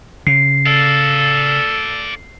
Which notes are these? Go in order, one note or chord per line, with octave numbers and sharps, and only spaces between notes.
C#3 C7
A4 D5 F5